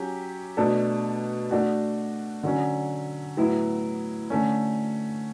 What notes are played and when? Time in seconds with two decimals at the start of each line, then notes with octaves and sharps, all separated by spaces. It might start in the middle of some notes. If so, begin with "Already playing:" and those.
Already playing: F#3 C#4 G4
0.57 B2 A3 D4 A4
1.51 A3 D4 F#4
2.43 D3 F#3 C#4
3.37 A2 F#3 B3 E4
4.30 D3 A3 C#4